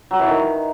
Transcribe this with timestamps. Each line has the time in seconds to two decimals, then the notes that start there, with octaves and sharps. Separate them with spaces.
0.11 F#3
0.19 E3
0.28 D#3